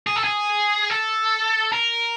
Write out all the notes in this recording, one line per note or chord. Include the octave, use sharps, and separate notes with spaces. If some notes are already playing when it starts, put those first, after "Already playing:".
G#4
A4
G#4
A4
A#4